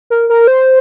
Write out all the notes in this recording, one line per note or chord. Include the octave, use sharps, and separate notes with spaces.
A#4
A#4
C5